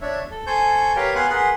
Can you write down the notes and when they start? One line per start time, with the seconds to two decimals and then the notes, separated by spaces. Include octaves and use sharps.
0.01 D4 C#5 E5
0.31 A4
0.47 A4 C5 G#5 C#6 G6
0.96 G4 A#4 B4 C#5 F5 G5
1.15 B3 F5 F#5 G#5 C6 F#6
1.30 G#4 A#4 B4 F#5 C6